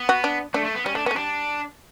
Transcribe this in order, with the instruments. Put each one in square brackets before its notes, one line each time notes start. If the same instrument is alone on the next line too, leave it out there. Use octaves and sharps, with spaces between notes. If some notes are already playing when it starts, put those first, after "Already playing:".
Already playing: [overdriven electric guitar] B3
[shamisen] F#4
D4
[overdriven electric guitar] A3 [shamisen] D4
[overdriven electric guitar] A3
B3
[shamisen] G3 [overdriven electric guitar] C#4
[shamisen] A3 [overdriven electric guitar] D4
[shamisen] B3 [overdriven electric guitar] C#4
[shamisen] A3
[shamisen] G3 [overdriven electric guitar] D4